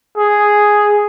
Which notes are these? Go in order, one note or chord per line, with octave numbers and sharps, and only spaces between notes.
G#4